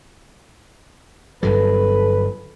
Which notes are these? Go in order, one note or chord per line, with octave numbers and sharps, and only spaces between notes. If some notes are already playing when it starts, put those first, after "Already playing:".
G1 G2 F#3 A4 B4